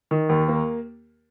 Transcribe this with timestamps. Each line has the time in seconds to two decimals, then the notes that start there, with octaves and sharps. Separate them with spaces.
0.11 D#3
0.29 D#2
0.48 A#3